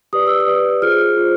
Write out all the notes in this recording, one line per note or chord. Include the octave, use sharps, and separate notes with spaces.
G4 B4 D5 D#6
E6
D#6
G4 B4 D5
F4 G#4 C5 F6
F4 G#4 C5